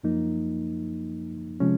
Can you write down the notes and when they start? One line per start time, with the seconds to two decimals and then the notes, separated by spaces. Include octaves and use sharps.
0.03 F#2 F3 A#3 D#4
1.60 C3 F3 G#3 C#4